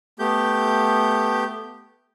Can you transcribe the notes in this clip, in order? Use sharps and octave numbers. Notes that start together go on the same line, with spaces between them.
A3 B3 G4 G6